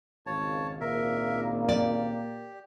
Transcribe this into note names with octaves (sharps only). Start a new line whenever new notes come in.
G#1 C#2 C#5 F5 A5
A#2 A#3 A#4 E5
G4 D5